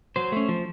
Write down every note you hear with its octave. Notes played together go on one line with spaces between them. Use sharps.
F#3 C5
A3 C#4
F3